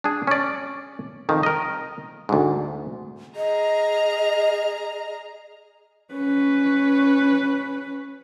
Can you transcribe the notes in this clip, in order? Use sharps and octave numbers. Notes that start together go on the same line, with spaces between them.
D4 G#4
C#4 D5
F2 D#3
A#4 D#5
D2 G#2
G#4 D#5 A#5 F6
C#4 B4